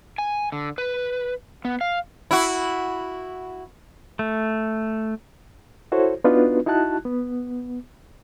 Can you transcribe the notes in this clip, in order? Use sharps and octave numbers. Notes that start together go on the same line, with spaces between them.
G#5
D3
B4
B3
F5
E4 F#4
A3
E4 F#4 A4 C5 C#5
B3 D4 D#4 F4 F#4 B4
D#4 E4 F#4 A5 F#6
B3